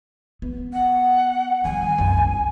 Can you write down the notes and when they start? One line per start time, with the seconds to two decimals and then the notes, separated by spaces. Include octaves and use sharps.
0.42 B3
0.73 F#5
1.64 D#3 G3 G#5
1.98 F#1 C2